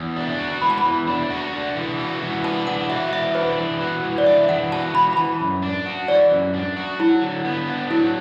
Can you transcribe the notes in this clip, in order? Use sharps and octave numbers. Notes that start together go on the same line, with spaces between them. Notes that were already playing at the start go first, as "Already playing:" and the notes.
Already playing: E2
D4
F#4
E3 B5
A5
B5
E2
D4
F#4
D4
E3
F#4
E3
D4 A5
E3 F#5
F#4 E5
E3 E5
D4 B4
E3
F#4
E3
D5
D4 E5
E3 F#5
F#4 A5
E3 B5
B5
E3 A5
F#2
D4
F#4
E3 D5
F#2
D4
F#4
F#3 E4
D3
B3
D4
F#3 E4